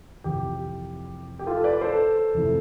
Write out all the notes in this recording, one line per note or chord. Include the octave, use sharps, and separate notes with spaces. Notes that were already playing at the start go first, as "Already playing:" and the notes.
F2 C3 E3 G4
G4
F4 A4
B4 D5
A4 C5
F2 C3 E3 A3